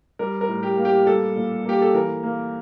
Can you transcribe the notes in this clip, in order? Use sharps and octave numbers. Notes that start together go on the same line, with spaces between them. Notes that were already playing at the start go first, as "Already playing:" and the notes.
G3 A#4
A#4
A2
G4
A#3
G4
G3 A4
A#2
A#3 G4
A4
E3 A#4
A#3